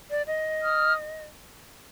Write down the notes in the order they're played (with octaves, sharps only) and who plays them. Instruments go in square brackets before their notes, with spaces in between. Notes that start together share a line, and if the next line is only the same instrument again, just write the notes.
[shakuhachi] D5
D#5
[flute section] D#6 F6